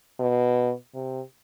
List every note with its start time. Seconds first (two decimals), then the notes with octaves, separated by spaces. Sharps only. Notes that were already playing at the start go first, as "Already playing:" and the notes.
0.20 B2
0.95 C3